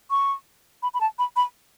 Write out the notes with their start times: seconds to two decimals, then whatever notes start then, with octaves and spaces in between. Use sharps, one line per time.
0.11 C#6
0.83 B5
0.94 B5
1.01 A5
1.19 B5
1.36 B5